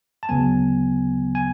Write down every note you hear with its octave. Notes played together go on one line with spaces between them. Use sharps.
A5
D2 C#3 F#3 B3 G#5
G#5